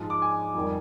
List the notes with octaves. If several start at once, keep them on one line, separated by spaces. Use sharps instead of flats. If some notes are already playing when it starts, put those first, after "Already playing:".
Already playing: G#2 F3 G#3
D6
G#5
F2 D#3 G3